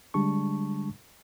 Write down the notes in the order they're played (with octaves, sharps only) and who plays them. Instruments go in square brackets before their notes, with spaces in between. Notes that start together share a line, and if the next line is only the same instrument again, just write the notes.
[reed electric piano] D3 G3 G#3 D4 A5 C#6